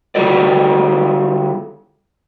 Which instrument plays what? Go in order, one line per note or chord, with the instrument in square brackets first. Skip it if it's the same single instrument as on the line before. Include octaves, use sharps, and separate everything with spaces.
[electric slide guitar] D3 G3 E4 F#4 A4 D5